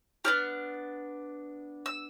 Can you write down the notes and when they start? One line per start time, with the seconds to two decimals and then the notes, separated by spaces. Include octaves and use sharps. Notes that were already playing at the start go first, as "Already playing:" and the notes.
0.25 B3 D4 G4 F6
1.86 E6